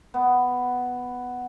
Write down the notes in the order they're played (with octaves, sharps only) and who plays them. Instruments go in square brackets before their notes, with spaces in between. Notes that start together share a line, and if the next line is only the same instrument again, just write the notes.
[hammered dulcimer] B3